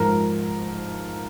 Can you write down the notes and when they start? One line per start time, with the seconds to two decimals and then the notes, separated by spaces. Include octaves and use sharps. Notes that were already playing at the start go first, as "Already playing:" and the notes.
Already playing: G#2 F3 A#4